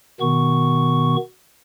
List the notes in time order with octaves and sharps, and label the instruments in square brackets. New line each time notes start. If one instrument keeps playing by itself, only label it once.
[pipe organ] B2 D#3 B3 C#6